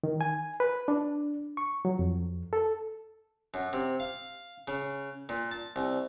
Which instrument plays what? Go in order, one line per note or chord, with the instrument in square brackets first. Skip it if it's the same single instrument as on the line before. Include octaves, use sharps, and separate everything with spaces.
[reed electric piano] D#3
G#5
B4
D4
C#6
F#3
F2
A4
[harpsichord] F#2
C3
F5
C#3
A#2
A5
C2